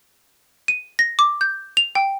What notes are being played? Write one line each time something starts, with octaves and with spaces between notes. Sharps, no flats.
D#7
A#6
D6
G6
F7
G5